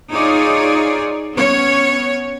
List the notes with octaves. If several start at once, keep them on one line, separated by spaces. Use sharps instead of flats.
D#4 F4 G#4 C#5 D5
B3 C#4 C#5